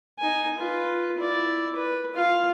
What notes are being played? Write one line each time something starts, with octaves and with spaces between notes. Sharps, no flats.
D#4 G#5
F4 B4
E4 D5
B4
F4 F5